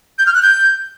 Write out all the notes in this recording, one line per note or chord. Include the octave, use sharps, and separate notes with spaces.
G6
F6
F#6
G6